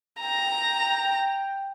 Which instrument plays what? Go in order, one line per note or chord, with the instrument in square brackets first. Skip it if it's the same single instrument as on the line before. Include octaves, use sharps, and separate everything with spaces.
[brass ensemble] G5 [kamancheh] A#5